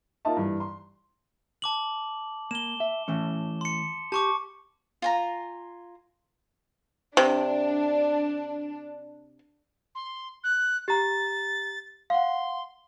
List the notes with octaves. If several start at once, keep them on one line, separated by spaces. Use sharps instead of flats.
A#3 D#4 F4 D#5 E5 A5
G2 E3
C6
A5 D6 F#7
A#3 E7 G7
E5
E3 A3 C#4
C6 C#7
G4 A5 C#6 D6
F4 G#5 A#5
C3 D4
C6
F#6
G4 A#5 A6
F5 F#5 C6